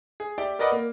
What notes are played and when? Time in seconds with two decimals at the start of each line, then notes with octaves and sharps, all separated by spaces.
0.20 G#4
0.38 G4 D5 E5 G5
0.59 A#4 B4 D5 D#5 F#5 B5
0.72 A#3